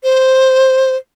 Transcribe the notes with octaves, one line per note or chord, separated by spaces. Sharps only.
C5